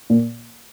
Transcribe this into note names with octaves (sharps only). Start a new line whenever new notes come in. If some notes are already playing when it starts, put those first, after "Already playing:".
A#2